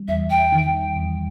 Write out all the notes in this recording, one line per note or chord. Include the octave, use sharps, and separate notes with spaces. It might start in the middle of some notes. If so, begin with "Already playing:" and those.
Already playing: G3
E2 E5
G5
D#3
E2